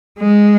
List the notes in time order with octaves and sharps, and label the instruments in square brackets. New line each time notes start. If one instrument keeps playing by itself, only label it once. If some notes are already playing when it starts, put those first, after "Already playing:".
[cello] G#3